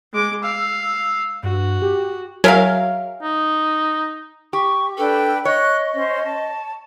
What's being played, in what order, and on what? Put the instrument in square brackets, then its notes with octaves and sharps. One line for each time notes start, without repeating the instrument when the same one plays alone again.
[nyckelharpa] G#3 D6
[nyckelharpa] F5 [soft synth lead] E6
[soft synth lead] G2 [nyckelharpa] F#4
[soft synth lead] G4
[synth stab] F#3 A#4 [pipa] G#4 E5 F5
[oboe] D#4
[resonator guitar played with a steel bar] G4 [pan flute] C#6
[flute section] D4 B4 G5 [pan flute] A4
[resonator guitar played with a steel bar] C#5 [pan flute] D#5 [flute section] F#6
[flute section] C#4 C5
A5